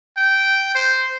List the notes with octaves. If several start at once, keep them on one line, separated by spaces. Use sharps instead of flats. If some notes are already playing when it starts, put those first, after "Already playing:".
G5
C5